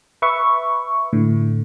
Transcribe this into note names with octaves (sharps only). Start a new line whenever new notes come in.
B4 E5 C#6
A2 D3